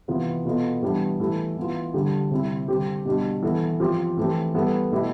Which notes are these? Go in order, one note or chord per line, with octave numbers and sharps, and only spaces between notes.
C3 E3 B3 F4
B2 B3 F4 A4
E3 G3 B3 D4
E3 A3 E4 G4
E3 B3 F4
D3 G3 D4 G4
C3 G3 C4 E4
D3 G3 C4 G4
B2 G3 D4 G4
E3 B3 E4 A4
F3 C4 G4
E3 A3 C4 G4
G3 B3 E4 A4
B2 A3 E4 G4